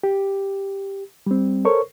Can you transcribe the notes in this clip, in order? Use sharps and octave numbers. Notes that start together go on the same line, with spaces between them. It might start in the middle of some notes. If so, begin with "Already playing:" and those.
G4
G3 C4
A4 A#4 C5 C#5 C#6